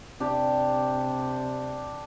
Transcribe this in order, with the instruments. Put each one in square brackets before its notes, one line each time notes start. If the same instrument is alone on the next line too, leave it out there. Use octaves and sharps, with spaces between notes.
[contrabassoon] C3 [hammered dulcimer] D4 G4